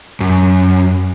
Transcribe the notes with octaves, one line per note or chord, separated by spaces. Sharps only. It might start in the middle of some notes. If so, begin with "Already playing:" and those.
F#2